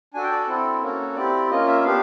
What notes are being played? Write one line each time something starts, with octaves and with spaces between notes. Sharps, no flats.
D4 F#4 A4 G#5
G5
D5
C4 E4 A4
A#3 C#4 F#4 A4
C4 E4 G4 D5
A#3 C#4 F4 D#5
E5
B3 D4 G4 F5